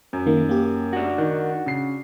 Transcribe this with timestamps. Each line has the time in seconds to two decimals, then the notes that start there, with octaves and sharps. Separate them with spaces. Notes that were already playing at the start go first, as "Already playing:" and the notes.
0.13 F#2
0.26 D#3 A#3
0.49 A#3 G4
0.93 D4 F#4
1.18 D#3 F#5
1.66 C#3 C7